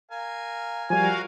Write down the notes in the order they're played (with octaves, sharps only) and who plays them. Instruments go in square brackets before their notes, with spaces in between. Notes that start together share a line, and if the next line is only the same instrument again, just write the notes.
[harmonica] A#4 F5 G#5
[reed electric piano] F3 G3 [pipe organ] F#4 A#4 F5 [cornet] G#5